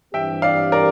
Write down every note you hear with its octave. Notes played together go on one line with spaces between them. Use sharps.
G2 E3 G3 C4 G4 E5 G5
D5 F5
A#4 D5